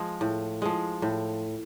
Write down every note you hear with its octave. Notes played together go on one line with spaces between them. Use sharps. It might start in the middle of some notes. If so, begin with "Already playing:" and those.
Already playing: F3 G#3
A2
F3 G#3
A2